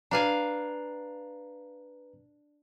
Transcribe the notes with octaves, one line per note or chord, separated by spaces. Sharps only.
D4 B4 F5 G#5 A#5